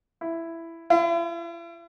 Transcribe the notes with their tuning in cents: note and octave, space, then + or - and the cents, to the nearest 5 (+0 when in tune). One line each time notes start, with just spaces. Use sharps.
E4 +10
E4 +45